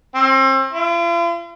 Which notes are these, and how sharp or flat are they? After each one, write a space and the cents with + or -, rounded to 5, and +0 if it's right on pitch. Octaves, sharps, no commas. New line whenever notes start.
C4 +35
F4 -45